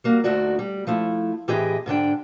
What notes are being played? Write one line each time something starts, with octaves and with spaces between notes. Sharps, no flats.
G3 A#3 F#4
D2 A3 D#4 F#4 D5
G3
F3 A3 E4
A2 E3 C4 G4 G#4 D#5
G#2 D3 D4 G5